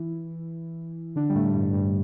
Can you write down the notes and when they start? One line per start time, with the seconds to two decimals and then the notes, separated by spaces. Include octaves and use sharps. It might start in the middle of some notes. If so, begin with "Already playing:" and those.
Already playing: E3 E4
1.16 D3 D4
1.29 G3
1.35 A2 A3
1.53 G2 G3
1.72 G2 G3